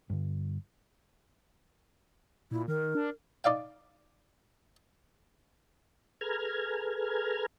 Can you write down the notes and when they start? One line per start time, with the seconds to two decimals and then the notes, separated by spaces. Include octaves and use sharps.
0.10 G2 D3
2.51 A#2 E4
2.68 D#3 A#4
2.95 D4
3.44 D#4 D5 F5 G5
6.21 G#4 A4 B4 A#5 F6 G#6